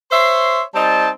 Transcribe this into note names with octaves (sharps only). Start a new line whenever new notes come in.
C5 C#5 E5 C6
G3 C4 D#4 A5